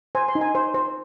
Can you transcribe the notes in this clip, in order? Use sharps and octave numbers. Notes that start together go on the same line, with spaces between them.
C5 G#5
C6
D#4
G#5
C5
C5